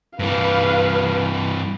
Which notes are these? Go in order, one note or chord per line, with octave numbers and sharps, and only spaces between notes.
G2 E3 B4 F5